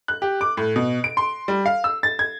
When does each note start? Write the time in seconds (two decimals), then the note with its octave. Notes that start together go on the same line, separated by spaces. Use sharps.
0.08 F#6
0.22 G4
0.41 D6
0.57 A2
0.76 B2
1.04 D7
1.17 C6
1.48 G3
1.66 F5
1.84 E6
2.03 A6
2.19 G#6